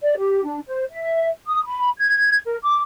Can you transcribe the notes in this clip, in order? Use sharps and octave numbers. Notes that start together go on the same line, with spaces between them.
D5
G4
D4
C5
E5
D#6
B5
G#6
A#4
D6